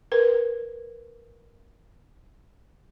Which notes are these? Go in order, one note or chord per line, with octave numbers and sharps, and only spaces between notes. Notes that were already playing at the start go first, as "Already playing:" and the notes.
A#4 B4